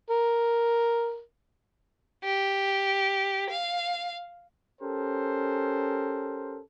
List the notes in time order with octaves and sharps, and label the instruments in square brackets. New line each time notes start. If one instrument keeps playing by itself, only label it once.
[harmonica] A#4
[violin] G4
F5
[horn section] C#4 G4 A4 A#4 C5